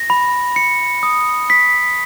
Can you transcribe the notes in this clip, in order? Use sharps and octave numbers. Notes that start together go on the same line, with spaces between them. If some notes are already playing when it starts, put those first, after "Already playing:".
Already playing: A#6
B5
C#7
D#6
B6